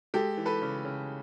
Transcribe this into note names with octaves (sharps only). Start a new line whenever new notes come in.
G#3 G4 A4
E3
A4 B4
C#3
C#3